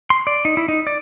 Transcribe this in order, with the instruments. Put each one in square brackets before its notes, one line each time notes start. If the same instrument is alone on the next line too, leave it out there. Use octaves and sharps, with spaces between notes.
[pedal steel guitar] C6
D5
D#4
E4
D#4
D5